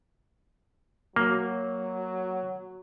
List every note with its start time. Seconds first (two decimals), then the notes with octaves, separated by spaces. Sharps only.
1.16 F#3 A#3